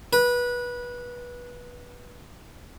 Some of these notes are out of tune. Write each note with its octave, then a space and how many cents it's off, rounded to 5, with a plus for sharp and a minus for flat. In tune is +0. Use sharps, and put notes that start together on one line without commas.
B4 -20